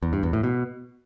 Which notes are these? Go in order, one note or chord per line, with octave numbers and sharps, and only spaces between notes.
E2
G2
E2
A2
B2